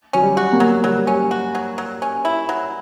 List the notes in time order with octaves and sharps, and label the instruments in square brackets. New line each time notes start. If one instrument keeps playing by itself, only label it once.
[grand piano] F#3 [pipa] C#4
[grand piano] G3
[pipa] F#4
[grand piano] A#3
[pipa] F#3
[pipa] F#3 [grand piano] G3
[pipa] C#4
F#4
F#3
F#3
C#4
E4
F#3